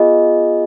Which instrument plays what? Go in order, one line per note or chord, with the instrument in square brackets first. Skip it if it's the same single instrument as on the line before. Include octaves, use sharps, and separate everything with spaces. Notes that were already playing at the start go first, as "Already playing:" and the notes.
Already playing: [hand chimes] B3 F4 G#4 D#5